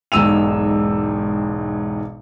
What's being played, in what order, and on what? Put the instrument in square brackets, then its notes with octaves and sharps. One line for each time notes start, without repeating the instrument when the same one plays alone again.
[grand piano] E1 B1 G#2 E6 D#7 F7